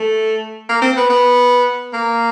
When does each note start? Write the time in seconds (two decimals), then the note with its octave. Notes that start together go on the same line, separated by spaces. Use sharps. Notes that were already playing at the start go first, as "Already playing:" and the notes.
Already playing: A3
0.69 A#3
0.82 C4
0.97 B3
1.10 B3
1.94 A#3